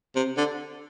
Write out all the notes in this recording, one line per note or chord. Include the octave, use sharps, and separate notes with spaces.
C3
D3